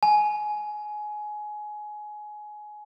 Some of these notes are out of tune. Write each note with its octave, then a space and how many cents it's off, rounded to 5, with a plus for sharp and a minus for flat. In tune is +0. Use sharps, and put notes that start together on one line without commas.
G#5 +20